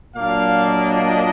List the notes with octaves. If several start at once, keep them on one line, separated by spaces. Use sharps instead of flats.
A#2 F#3 A#3 D4 F5
D#5